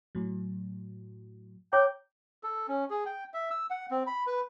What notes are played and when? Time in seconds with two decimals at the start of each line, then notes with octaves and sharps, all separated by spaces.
0.15 A2 F#3
1.73 C#5 G5 A#5 D6
2.44 A4
2.68 C#4
2.90 G#4
3.06 G5
3.34 E5
3.51 E6
3.70 F#5
3.91 C4
4.07 B5
4.27 B4